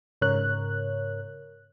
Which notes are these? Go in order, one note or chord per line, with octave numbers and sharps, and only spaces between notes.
G#2 C#3 A#4 C#5 F#6